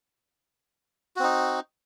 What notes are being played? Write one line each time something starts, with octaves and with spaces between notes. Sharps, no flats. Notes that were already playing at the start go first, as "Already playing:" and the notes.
C4 D#4 F#4